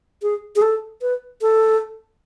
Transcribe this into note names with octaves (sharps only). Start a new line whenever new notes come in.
G#4
G#4
A4
B4
A4